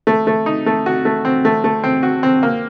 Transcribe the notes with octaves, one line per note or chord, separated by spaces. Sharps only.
A3
A3
D#4
A3
F#4
A3
C4
A3
A3
C4
F#4
C4
A#3